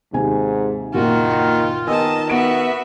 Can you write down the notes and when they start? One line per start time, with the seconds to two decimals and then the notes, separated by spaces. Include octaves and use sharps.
0.13 D#2 G#2 C3 G#5
0.94 F#1 A#2 D#3 F4 F#4
1.87 D#3 B3 D#5 G#5 A5 E6
2.29 B3 F#4 E5 D7